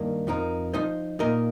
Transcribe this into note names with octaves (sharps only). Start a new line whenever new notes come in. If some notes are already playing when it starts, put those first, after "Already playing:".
Already playing: G2 D#3 A#3
F2 F3 D#4 A#4
F3 D#4 C5 D#5
A#2 A#3 D#4 A#4 D#5